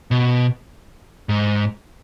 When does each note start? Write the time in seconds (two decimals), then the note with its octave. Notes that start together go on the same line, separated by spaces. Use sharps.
0.11 B2
1.29 G#2